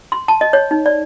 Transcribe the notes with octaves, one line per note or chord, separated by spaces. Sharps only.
C6
A5
D#5
C#5
D#4
D5